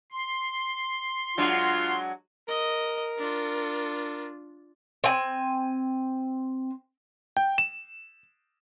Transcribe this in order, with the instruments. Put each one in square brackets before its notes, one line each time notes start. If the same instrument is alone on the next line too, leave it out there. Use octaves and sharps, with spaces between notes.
[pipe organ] C6
[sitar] F#3 G#3 D4 [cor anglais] F4
[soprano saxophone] A#4 [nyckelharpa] D#5
[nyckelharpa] D4 F4
[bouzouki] C4 G#5
[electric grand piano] G5
E7